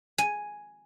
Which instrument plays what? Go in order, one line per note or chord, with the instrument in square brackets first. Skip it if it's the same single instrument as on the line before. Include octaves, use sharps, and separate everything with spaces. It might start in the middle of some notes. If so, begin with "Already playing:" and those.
[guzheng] G#5